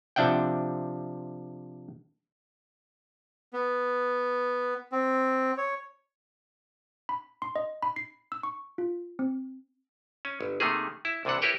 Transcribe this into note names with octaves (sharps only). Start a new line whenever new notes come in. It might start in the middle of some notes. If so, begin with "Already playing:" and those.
C3 F3 D4 E5 F#5 G5
B3
C4
C#5
B5
C6
D#5
B5
C7
E6
C#6
F4
C4
C#4
G1
C3 D#3 A3 A#3 G#4
E4
C2 C3 E3 D4 F#5
E4 G4 A#4 B4 C#5 G5